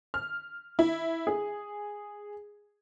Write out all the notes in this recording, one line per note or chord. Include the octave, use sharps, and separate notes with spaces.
F6
E4
G#4